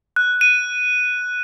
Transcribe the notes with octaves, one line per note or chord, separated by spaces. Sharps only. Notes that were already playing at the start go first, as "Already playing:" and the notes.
F#6
D#7